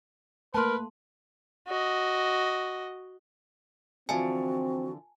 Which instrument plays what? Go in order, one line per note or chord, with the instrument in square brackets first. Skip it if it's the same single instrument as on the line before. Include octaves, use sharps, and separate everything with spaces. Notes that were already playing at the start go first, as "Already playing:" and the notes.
[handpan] A3 A#3 [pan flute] A#4 [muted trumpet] B4 [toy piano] A5 C6
[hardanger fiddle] F#4 D#5
[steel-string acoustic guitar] D3 E3 F3 [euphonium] C4 [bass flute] F#4 [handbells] G#5 A5